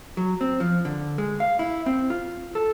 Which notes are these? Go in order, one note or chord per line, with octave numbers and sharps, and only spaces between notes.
F#3
C4
F3
D3
G#3
F5
E4
C4
F4
A4